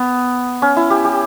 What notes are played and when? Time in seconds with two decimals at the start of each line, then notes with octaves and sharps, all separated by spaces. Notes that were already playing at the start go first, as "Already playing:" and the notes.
Already playing: B3
0.62 C#4
0.76 E4
0.90 G4
1.05 G4